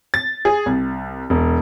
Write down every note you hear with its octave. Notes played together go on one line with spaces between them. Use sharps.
A6
G#4
C2
E1